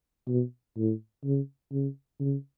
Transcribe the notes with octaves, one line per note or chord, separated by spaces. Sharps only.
B2
A2
C#3
C#3
C#3